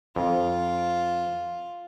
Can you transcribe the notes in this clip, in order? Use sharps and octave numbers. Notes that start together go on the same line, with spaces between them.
F2 F4